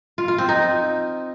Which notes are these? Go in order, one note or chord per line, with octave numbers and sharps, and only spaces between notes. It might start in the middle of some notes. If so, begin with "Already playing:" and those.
F4
F4
C4
D#4